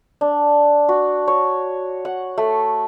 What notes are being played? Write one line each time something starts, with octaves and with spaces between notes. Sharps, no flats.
D4
F#4
C#5
F#5
A3